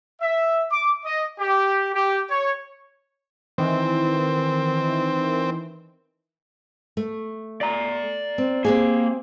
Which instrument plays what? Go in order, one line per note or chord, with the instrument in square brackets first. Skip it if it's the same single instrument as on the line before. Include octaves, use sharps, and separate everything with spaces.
[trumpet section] E5
D6
D#5
G4
G4
C#5
[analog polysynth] D#3 E3 [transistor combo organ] C4
[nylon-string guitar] A3
[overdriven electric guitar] D5 A#5
[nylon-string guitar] C4
[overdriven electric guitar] A#3 [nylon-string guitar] C4 G4 G#4